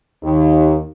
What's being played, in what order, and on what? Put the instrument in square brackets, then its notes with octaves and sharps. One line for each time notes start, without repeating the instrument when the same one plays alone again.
[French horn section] D#2